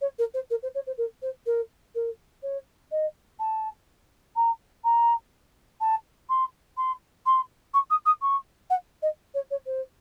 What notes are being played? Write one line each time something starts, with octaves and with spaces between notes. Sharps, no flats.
C#5
A#4
C5
A#4
C5
C#5
C5
A#4
C5
A#4
A#4
C#5
D#5
A5
A#5
A#5
A5
C6
C6
C6
C#6
D#6
D#6
C#6
F#5
D#5
C#5
C#5
C5